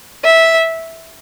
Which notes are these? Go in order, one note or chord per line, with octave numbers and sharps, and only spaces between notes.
E5